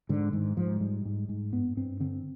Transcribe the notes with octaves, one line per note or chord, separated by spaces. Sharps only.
G#2 D3
G#2 D#3
G#2 F3
G#2 G3
G#2
G#2
G2 B3
G2 C4
D3 C4